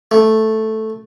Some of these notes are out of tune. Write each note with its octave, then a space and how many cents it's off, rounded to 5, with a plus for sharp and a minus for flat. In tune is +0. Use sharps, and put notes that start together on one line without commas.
A3 -5